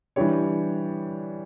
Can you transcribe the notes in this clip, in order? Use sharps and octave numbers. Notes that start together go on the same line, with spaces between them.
E3 G3 D4 G4 C#5